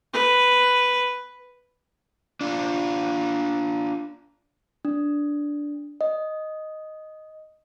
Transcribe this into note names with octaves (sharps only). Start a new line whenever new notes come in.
B4
D4 F4
D4
D#5